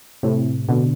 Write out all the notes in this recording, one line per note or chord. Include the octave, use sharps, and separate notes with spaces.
A2 C3
B2 D3